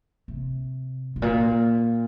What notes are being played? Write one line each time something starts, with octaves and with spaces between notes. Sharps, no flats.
C3
G#2
A#2